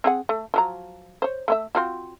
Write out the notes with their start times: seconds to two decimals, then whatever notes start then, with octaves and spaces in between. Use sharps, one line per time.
0.04 C4 G#4 F#5
0.29 A3
0.54 F3 F#3 A#5
1.22 C5 C#5
1.48 A3 C4 E5
1.75 C4 F4 F#4